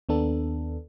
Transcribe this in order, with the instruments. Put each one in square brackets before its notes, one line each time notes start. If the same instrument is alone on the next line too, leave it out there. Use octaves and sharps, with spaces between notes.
[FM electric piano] D#2 B3 D4 A4